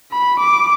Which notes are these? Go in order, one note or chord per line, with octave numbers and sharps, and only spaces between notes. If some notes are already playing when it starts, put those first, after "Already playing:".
B5
D6